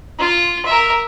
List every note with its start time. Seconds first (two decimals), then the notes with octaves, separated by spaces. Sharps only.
0.19 F4
0.66 A#4 E5